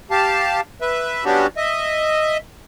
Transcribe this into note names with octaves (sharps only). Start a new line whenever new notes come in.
G4 F5 A5
B4 E5
G3 B3 C#4 D4 F#4 G4
D#5 E5